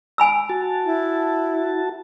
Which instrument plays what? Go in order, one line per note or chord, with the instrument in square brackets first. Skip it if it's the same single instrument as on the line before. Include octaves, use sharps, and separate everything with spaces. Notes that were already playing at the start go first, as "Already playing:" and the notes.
[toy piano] G#5 B5 E6
[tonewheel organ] F#4 A5
[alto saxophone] E4